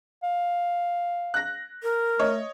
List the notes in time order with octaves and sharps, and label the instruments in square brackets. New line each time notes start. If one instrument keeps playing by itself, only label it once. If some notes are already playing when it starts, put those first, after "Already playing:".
[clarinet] F5
[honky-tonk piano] F#6 A#6
[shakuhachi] A#4
[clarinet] A3 [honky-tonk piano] C#5 D#5